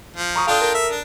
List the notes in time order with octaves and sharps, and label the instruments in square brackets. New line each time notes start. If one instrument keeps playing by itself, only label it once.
[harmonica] F3
[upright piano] A#5 C#6 D#6
[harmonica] D4 F4 G5 [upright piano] A4 D#6 [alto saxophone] F5
[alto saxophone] A#4
[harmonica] E5
D4